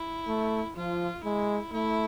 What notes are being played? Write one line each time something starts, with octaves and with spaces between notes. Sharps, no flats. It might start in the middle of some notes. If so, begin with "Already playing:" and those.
Already playing: E4
A3
F3 F4
G#3 E4
A3 E4